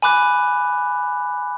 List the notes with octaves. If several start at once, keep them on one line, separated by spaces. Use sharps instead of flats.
G#5 B5 D6 F#6